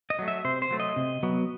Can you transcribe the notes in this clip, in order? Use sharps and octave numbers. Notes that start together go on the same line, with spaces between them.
D#5
F#3 A3
E5
C3 C5
C5
F#3 A3
D#5
C3
F#3 B3